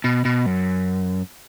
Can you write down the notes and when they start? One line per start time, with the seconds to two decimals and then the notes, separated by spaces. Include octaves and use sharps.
0.04 B2
0.25 B2
0.46 F#2